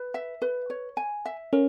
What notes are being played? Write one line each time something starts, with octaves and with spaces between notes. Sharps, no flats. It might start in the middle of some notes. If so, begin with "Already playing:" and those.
Already playing: B4
E5
B4
C#5
G#5
E5
C#4 A#4